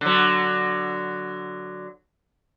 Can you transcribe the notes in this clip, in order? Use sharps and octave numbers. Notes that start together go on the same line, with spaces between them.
D3 F#3